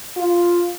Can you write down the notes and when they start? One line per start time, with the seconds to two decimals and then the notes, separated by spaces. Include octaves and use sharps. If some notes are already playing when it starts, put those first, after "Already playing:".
0.17 F4